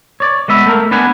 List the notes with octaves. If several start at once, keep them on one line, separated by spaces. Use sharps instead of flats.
C#5 D5
G#3 B3 E5 B5
A3 A#4
B3 D4 B4 F#5 G#5